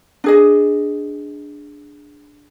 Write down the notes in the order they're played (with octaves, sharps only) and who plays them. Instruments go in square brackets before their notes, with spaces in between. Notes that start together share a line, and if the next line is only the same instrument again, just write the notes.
[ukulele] D4 G#4 D#5